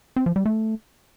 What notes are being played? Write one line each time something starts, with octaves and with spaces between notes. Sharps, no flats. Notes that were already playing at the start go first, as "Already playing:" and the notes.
C4
F3
G3
A3